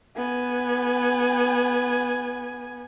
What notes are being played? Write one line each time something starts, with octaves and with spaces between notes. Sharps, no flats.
B3 G#5